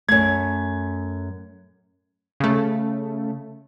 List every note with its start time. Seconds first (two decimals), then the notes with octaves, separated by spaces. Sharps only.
0.09 F#2 A3 G#6
2.40 C#3 A3